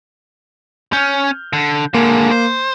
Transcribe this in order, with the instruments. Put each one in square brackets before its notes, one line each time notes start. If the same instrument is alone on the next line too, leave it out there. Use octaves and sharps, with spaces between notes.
[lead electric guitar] C#4 [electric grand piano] F6 G6
[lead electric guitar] D3
[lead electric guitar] D3 G#3 [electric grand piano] A#3
[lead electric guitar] C5